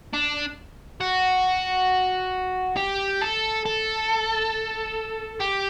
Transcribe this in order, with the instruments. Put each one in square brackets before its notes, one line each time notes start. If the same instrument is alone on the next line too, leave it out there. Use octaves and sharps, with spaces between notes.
[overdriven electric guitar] D4
F#4
G4
A4
A4
G4